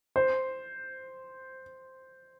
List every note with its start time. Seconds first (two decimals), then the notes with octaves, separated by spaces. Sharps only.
0.16 C5